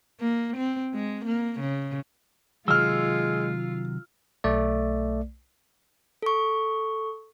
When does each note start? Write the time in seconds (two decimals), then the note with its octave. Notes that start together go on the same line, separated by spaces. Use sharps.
0.21 A#3
0.57 C4
0.94 G#3
1.26 A#3
1.60 C#3
2.68 C3 D#3 F#3 G#3 F4 E6 F6
4.44 B1 A3 D5
6.22 A4 C#6